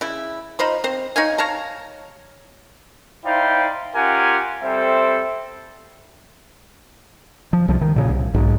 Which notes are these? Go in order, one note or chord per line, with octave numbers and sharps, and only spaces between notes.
C#3 E4
D#4 F4 C5 B5
C4 C5
D#4 C#5 F5 G#5
C#5 F5 A5 A#5
D#4 E4 C5 D5 F5 G5
C#4 F4 G4 A#4 F#5 G#5
G3 C4 A4 C5 E5
F3
C2 F3
D#3
A#2 C#3
C2
B1 G#2